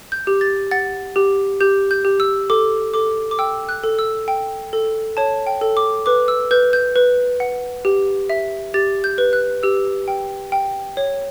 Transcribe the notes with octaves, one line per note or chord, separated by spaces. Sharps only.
G6
G4
A6
F#5 A6
G4
G4 G6
G6
G4
E6
A4 D6
A4 D6
D6
G5 E6
F#6
A4
E6
G5
A4
C#5 A5
G5
A4
D6
B4 D6
E6
B4 G6
G6
B4
F#5
G4
E5
G4 A6
G6
B4
F#6
G4 E6
G5
G5
C#5